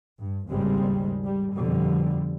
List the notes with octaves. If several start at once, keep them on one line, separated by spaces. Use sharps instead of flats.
G2
G#1 D#2 C#3 G3 G#3 C4
G3
F2 B2 D3 F3 G3